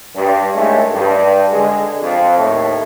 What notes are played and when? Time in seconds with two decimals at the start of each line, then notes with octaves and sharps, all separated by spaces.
0.16 G2
0.54 D#2 A2 G#3 A3
0.92 G2
1.52 D3 G#3
2.02 F2
2.37 D#2 A2